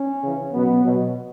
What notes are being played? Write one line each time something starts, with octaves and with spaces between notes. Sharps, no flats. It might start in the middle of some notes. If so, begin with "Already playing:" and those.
Already playing: C#4
C#3 E3
B2 F#3 B3
B2 F#3